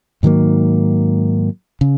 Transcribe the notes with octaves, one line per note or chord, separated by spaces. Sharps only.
G#2 D#3 F#3 A#3
C#3